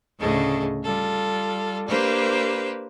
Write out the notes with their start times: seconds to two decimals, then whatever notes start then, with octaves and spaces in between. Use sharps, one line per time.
0.18 D2 A2 C#3 G#4 A4 D#5
0.84 G3 F4 A4
1.87 A#3 D4 G4 B4 C5